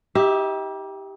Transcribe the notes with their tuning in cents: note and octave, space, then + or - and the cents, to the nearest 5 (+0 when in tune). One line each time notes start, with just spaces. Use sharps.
D#4 +40 G4 +0 E5 +0